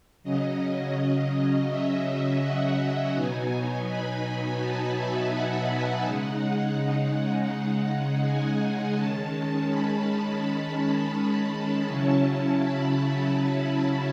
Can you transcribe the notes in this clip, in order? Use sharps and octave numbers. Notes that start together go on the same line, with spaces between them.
C#3 F#3 C#4 D#5
D#5
E5
F#5
B2 F#3 B3 D#4 G#5
B5
A5
E5
F#5
C#3 G#3 D#4
F#5
G#5
D#3 G#3 C#4 A5
B5
A5
B5
A5
C#3 F#3 C#4 E4
B5